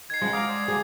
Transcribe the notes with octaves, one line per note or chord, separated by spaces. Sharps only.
D#3 G#6 C7
C#3 F3 G#3 F#5
F5 A#5 D6 D#6
C5 D5
D3 A#3 G#4